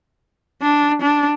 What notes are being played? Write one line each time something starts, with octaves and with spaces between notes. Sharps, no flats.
D4
D4